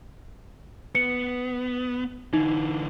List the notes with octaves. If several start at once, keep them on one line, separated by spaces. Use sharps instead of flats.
B3 C#7
D3 E3 D#4